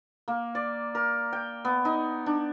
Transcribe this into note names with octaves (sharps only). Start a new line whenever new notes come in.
A#3
D5
A#4
G5
B3
D#4
D4